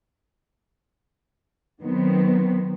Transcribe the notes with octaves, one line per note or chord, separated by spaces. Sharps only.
D#3 F#3 B3 C4